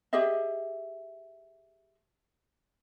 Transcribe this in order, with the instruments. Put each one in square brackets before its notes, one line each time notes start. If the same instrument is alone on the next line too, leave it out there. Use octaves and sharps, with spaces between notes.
[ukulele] G4 G#4 D#5 E5